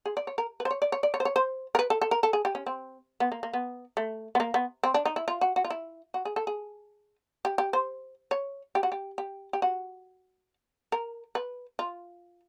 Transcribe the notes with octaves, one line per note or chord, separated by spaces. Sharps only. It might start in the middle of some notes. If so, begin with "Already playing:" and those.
G#4
D5
C#5
A#4
B4
C5
C#5
D5
C#5
D5
C#5
C5
C#5
C5
A#4
B4
A4
A4
A#4
A4
G#4
G4
C#4
C4
B3
A#3
A#3
B3
A3
B3
A#3
B3
C4
D4
D#4
E4
F4
F#4
F#4
F4
E4
F#4
G#4
A4
G#4
G4
G4
C5
C#5
G4
F#4
G4
G4
G4
F#4
A#4
B4
F4